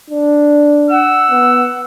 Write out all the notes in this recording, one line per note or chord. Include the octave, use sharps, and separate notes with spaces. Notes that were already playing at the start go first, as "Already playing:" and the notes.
D4
F#5 E6
B3